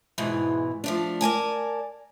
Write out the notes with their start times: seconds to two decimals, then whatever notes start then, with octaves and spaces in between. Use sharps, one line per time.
0.18 E2 G#2 B2 E3
0.84 F3 A3 D4
1.21 A#4 D5 G#5 A5